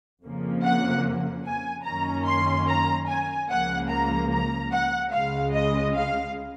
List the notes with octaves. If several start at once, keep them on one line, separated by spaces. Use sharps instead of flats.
F2 C#3 F3 A#3
F#5
G#5
F#2 D#3 A#3 C#4 A#5
C6
A#5
G#5
C#2 C#3 F3 A#3 F#5
A#5
A#5
F#5
C#2 C#3 G#3 F5
D#5
F5